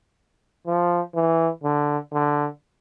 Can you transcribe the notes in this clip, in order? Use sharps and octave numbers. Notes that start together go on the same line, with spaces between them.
F3
E3
D3
D3